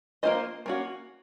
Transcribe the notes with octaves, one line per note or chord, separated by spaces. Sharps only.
A#3 C#4 F4 C5 D#5
A#3 C#4 F#4